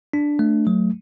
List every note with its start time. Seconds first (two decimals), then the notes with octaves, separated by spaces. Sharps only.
0.13 D4
0.39 A3
0.67 F#3